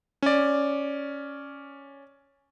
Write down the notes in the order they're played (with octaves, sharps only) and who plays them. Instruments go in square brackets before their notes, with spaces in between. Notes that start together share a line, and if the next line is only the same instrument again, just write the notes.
[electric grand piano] C#4 D5